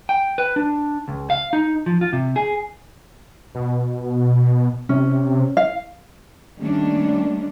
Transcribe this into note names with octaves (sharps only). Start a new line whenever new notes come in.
G5
B4
D4
C#2
F5
D#4
F3
F4
C3
G#4
B2
C3 C#4
F5
D#3 G3 A3 A#3 C#4 D4